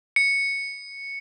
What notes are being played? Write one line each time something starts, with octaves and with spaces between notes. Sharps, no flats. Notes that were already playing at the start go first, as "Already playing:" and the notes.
C#7